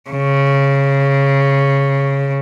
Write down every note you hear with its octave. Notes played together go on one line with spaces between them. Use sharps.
C#3